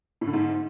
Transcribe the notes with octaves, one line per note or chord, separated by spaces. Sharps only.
A2
D3
G#2